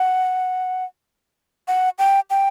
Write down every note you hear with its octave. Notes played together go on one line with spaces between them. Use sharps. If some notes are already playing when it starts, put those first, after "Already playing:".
Already playing: F#5
F#5
G5
G5